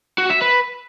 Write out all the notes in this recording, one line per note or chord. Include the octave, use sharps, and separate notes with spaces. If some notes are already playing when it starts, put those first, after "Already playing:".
F#4
E5
B4